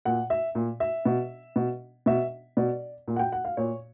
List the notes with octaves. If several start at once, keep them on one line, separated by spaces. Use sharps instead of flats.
A#2 F#5
E5
A#2
E5
B2
B2
B2 E5
B2 D5
A#2
F#5
G5
F#5
F5
A#2 C#5